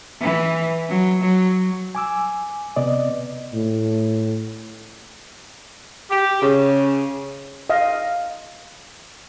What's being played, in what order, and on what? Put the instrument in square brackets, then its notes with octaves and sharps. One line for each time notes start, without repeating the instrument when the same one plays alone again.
[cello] E3
F#3
F#3
[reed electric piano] G#5 D6 E6
C3 B3 D5 D#5
[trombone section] A2
[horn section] G4
C#3
[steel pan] D#5 F5